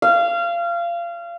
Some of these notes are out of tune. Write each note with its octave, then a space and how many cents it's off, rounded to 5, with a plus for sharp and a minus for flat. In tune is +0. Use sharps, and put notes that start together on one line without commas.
F5 -25